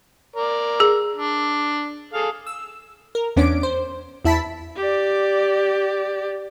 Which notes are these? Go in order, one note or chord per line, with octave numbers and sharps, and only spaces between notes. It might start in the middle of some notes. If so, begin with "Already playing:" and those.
A#4 D5
G#4
D4
G#4 A4 F5
E6
A#4
E2 B3 C#4 D4 D6 D7
C5
E2 E4 E5 A5 B5 B6
G4 D5